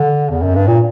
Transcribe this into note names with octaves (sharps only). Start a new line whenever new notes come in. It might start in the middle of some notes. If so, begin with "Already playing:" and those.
Already playing: D3
E2
F#2
G2
A#2